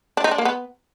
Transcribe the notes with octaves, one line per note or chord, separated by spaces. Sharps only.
D4
D#4
D4
A#3
B3